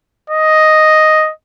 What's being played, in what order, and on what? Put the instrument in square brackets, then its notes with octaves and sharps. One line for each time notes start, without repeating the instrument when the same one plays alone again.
[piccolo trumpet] D#5